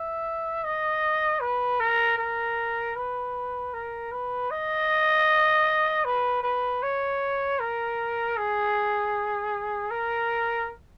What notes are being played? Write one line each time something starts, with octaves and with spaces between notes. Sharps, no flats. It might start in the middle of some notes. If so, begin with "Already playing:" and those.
Already playing: E5
D#5
B4
A#4
A#4
B4
A#4
B4
D#5
B4
B4
C#5
A#4
G#4
A#4